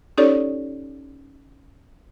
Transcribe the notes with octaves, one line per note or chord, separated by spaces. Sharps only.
C#4 D#4 G4 A4 C#5 D5